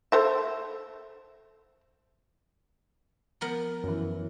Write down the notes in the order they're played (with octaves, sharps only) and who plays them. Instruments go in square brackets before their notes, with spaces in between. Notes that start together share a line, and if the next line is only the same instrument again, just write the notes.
[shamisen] A4 C5 E5
[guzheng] F3 B3 A#4
[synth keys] F#2 E3